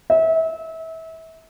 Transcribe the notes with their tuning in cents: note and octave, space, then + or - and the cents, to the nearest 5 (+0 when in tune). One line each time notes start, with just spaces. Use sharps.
E5 -30